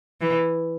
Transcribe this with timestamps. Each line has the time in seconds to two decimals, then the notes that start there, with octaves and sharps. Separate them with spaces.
0.21 E3